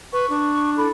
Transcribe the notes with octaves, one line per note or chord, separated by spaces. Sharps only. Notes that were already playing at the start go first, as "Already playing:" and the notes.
B4 C#6
D4
E4 A4 B5